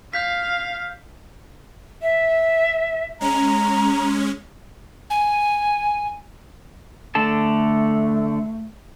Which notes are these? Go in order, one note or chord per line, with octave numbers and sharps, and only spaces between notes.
F5 F6 G6 B6
E5
G#3 C#4 A#5
G#5
D3 A3 A4 A5